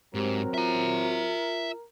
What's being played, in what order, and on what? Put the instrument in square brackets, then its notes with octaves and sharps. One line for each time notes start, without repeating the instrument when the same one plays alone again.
[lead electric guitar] G#2 [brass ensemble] F#3 C4 [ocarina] G4 [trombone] A#4
[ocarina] F4 [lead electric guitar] E5 A#5